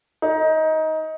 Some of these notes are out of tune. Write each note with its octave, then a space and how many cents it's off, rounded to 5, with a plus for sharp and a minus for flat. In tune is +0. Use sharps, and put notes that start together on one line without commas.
D#4 +20